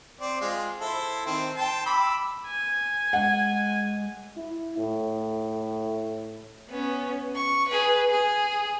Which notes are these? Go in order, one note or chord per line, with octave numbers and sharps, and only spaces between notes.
C4 D5
G#3 F4
E4 A4 C5
D#3 C4
G5 A5 C6
B5 D6 E6
G#5
G#3 F#5
E4
A2
B3 C#4
C#6
G#4 B4
G#4